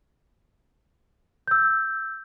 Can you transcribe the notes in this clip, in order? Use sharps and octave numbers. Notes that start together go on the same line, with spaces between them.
E6 G6